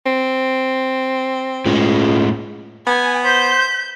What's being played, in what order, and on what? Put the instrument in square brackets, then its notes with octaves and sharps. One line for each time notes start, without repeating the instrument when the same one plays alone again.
[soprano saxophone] C4
[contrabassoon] C#2 [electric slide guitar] A2 G#3
[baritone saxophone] B3 [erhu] G#5
[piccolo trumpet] C5 [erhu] G6 [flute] B6